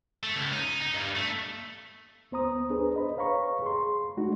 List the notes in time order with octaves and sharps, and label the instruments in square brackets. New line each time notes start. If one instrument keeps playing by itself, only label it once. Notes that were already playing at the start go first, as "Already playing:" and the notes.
[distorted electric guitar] A3
C#2
D#4
D#4
G2
A3
[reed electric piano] D2 B3 C5 A#5 D#6
D4 G#4 B4
C5 D#5 B5
B4 C#5 F5 A#5 B5 C#6
G#4 C6
G#3 A3 D4 D#4 F#4